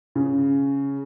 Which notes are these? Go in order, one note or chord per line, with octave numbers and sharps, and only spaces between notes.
C#3